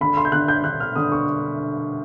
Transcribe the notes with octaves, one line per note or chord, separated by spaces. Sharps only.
D3 B5
C6
G6
D3 F#6
G6
D3 F#6
F6
D3 D#6
C#6